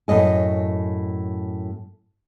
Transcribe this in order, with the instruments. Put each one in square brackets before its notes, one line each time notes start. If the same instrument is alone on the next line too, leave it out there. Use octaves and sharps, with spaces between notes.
[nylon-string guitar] F#2 A2 D#5 G#5